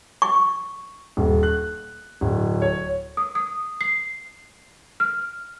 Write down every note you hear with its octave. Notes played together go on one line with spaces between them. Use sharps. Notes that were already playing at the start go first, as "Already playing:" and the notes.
C#6
D#1
F#6
D1
C#5
D#6
D#6
C7
F6